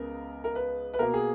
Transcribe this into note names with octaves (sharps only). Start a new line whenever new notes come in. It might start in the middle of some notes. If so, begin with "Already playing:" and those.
Already playing: C#2 C#3 B3 A#4
A#4
B4
B4
B2 A#3 A#4
G#4